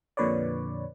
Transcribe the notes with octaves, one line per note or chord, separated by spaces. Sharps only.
F2 A#2 D3 B4 C#5 D5